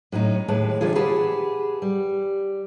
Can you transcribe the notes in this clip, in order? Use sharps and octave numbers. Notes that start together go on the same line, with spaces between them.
A2 F#3 C#4 D#4
D#2 A2 G#3 B4 A5
D3 E3 C4 F4 G#4
G4 G#4 B4 F#5 A5
G3